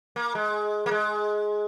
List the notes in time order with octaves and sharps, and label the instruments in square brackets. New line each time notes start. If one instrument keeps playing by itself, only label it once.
[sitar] A#3
G#3
A#3
G#3